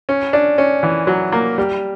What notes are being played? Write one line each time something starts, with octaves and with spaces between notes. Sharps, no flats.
C#4
D4
C#4
E3
F#3
A#3
G3